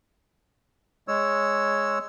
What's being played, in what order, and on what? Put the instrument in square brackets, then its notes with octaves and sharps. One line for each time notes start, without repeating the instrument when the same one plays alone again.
[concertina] G#3 C#5 E6